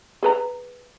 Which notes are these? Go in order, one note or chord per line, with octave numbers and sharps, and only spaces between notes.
G#4 B4 A#5